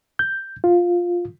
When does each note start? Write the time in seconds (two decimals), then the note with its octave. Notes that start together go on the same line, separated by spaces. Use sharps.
0.19 G6
0.64 F4